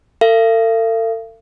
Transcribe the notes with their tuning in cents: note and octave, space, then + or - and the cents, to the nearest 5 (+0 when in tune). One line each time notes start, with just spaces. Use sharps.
A4 +40 F5 -45